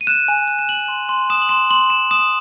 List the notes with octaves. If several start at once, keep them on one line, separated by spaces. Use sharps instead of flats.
D#7
F#6 E7
G#5
F#6
E7
F#6 F#7
C6
C6
D#6 E7
F#7
C6 E7
C6 F#7
C6 E7
D#6 E7